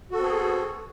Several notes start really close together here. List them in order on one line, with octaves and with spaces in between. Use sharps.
F#4 A4 C4 B3 G#4